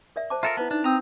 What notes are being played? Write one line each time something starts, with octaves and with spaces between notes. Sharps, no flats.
A#4 D5 E5
C5 A5 D6
F4 A4 A#4 E5 A#5
B3 E4 B4 A5
D4 D#4
C4 A#5 D#6